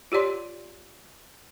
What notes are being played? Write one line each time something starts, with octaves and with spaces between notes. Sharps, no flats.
F4 G4 C#5 D5 C6